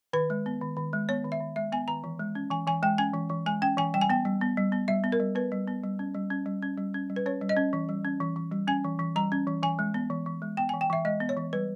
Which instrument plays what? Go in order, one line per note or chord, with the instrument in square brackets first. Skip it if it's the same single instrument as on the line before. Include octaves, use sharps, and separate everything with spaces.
[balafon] D#3 B4
G#3
B3
D#3
D#3
G#3
B3 C#5
D#3
E5
D#3
G#3 E5
B3 G#5
D#3 A#5
E3
G#3
C#4
E3 G#5
E3 G#5
G#3 G5
C#4 G#5
E3
E3
G#3 G#5
C#4 G5
E3 G#5
G3 G5
G#5
B3 G5
G3
B3
G3
B3
G3 E5
B3
A#4
G3
B3 B4
G3
B3
G3
C#4
G3
C#4
G3
C#4
G3
C#4
G3
B4
C#4 C#5
G3
D#5
C#4
E3
G3
C#4
E3
E3
G3
C#4 G#5
E3
E3
G3 A#5
C#4
E3
E3 G#5
G#3
B3
E3
E3
G#3
B3 G5
G#5
E3
G5
E3 E5
G#3 D#5
B3
C#5
E3
G3 B4